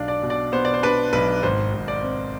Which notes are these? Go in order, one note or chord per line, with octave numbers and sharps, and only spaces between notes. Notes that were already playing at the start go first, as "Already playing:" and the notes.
Already playing: B1 D4 F5
D5
B2
D5
B3 C5
D5
C5
D4 B4
B1 B4
G#1 C5
G#1
D5
C4